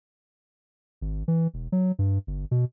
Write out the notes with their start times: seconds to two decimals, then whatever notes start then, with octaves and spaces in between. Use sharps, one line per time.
1.01 G#1
1.28 E3
1.54 E1
1.72 F#3
1.99 G2
2.27 G1
2.51 B2